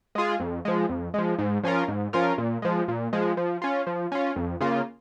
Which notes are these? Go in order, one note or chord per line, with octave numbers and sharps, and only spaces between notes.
G#3 F4 G#4
F2
F3 G#3
F2
F3 G#3
G#2
F3 C#4 F4 A#4
G#2
F3 C#4 F4 A#4
A#2
F3 G#3
A#2
F3 G#3
F3
C#4 F4
F3
C#4 F4
F2
C#3 A#3 F4